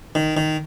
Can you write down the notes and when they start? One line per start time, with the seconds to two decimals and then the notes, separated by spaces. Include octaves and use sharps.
0.15 D#3
0.37 D#3